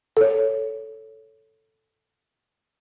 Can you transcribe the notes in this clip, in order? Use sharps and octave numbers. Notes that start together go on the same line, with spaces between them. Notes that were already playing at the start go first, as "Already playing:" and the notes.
A4 C#5